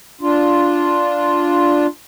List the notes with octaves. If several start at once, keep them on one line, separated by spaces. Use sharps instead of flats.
D4 F4